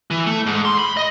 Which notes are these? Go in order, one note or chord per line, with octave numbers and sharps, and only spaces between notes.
E3
A3
G#2
C6
B5
D#5